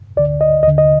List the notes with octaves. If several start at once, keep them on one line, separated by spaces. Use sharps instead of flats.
D2 D3 D5
D#5
D#2 D3 D#5
D#5